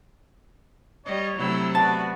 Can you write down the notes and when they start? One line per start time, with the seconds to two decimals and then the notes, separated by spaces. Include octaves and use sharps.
1.06 G3 C#5 D#5
1.38 C3 F#3 A3 E4 E6
1.75 B3 F#4 D5 A5